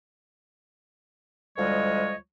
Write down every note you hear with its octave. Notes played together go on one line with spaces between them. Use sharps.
D2 F3 G3 G#3 C#5 D#5